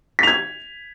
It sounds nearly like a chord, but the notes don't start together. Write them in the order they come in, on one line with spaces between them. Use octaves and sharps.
B6 F7 G#6